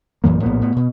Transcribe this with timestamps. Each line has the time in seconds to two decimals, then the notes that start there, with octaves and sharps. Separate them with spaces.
0.24 A#1 F#2 E3 A#3
0.43 A#1 A2 A#3 B3
0.61 A2 B3
0.76 B2